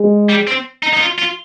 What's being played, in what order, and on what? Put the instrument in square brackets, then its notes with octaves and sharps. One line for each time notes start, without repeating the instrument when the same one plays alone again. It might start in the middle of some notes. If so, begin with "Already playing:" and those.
Already playing: [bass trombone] G#3
[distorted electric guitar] G3
C4
D#4
D#4
F4
F4